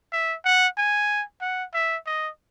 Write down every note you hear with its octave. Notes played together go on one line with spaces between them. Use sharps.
E5
F#5
G#5
F#5
E5
D#5